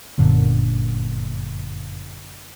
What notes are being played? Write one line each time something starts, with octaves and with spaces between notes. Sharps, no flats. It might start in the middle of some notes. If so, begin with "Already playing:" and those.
G1 F#2 A#2 D3